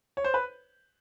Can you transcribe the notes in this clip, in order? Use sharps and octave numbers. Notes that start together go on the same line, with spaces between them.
C#5
C5
B4